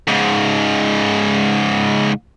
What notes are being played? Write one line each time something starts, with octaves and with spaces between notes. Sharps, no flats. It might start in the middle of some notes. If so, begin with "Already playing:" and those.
G#2 C#3